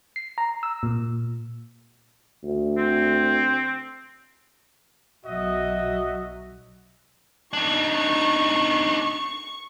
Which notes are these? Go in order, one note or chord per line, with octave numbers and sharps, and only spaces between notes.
C7
A#5
E6
A#2
D2
C4
B1 F#3 F#4 D#5 E5
D4 D#4 C#6